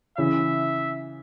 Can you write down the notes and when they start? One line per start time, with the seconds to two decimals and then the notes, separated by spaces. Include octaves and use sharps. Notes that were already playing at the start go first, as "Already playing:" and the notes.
0.18 C#3 E3 E5